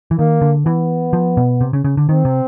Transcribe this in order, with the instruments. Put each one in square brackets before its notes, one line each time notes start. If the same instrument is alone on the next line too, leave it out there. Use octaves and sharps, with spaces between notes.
[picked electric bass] E3
[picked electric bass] D#3 [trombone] A#3
[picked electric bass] D3
[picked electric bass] E3 [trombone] B3
[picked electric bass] F3
B2
C3
C#3
C#3
D3
[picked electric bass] D#3 [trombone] C4
[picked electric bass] C3